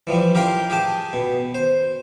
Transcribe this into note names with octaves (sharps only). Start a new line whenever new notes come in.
E3 F3 G3
G4 A#4 F5 G5 A#5 C6
G4 G#4 G5 A5
B2
C5